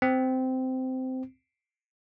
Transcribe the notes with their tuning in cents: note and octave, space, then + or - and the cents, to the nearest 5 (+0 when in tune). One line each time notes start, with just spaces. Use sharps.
C4 -15